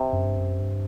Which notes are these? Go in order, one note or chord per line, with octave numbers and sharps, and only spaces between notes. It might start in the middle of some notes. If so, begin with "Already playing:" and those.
Already playing: C3
F#2
G2
F#2
G2